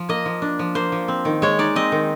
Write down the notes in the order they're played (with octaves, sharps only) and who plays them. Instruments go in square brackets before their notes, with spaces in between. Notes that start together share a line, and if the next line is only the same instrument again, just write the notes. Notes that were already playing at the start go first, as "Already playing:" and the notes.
Already playing: [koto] F3
A#3 D#5
F3
D4
F3
A#3 C5
F3
C4
D#3
G#3 C#5
D#4 D5
C4 D#5
D#3